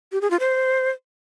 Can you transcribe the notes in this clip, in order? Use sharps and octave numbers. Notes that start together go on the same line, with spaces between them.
G4
G#4
F4
C5